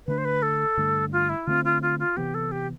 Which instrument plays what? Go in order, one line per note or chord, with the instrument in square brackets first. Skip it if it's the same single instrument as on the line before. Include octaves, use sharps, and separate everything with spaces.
[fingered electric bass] D3 A3 D4 [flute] B4
[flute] C5
B4
A4
[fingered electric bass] G2 D3 A3
[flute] F4
E4
[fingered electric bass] D3 A3 C4 [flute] F4
[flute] F4
F4
F4
[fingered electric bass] C3 E3 B3 [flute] G4
[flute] A4
G4